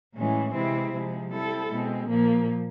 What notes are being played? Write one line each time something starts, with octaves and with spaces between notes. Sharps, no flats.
A2 E3 G#3 C#4
C3 E3 G#3 C4 E4
C3 F3 G#3
G3 C4 E4 A4
B2 G#3 C4
A#2 F3 A#3